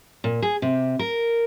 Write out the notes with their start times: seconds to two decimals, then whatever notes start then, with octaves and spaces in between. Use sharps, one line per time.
0.24 A#2
0.42 G#4
0.62 C3
0.99 A#4